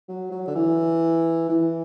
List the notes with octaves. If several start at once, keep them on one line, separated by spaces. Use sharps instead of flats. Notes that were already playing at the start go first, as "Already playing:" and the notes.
F#3
F#3
D3
E3
E3